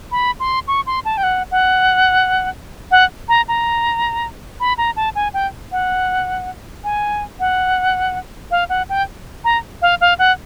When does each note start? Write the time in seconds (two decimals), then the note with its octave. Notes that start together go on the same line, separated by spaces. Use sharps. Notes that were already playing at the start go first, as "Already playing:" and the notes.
0.12 B5
0.40 C6
0.68 C#6
0.87 C6
1.05 A5
1.17 G5
1.23 F#5
1.51 F#5
2.91 F#5
3.29 A#5
3.48 A#5
4.60 B5
4.78 A#5
4.96 A5
5.15 G#5
5.34 G5
5.72 F#5
6.84 G#5
7.40 F#5
8.51 F5
8.69 F#5
8.89 G5
9.44 A#5
9.82 F5
10.01 F5
10.19 F#5